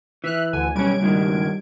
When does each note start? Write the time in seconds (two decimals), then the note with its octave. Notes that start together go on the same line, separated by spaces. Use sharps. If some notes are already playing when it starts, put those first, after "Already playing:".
0.24 E3 E5 F6 F#6
0.53 D2 D3 G#5
0.75 B1 G3 C#4 G#6 D7
1.00 C#2 G2 D#3